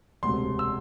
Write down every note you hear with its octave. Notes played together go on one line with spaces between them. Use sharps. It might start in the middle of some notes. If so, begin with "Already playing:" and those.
E1 D2 C3 C6
E6